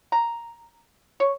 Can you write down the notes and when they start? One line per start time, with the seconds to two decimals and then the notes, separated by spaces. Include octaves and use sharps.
0.12 A#5
1.20 C#5